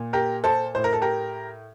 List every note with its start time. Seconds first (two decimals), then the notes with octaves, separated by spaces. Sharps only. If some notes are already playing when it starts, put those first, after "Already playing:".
Already playing: A#2
0.13 G4 A#4
0.44 A4 C5
0.75 A2 C5
0.84 A#4
0.93 A4
1.02 G4 A#4